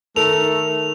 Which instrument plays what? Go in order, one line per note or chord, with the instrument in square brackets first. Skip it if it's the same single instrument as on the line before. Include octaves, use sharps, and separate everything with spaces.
[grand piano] D#3 A#4 [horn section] A3 [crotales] F7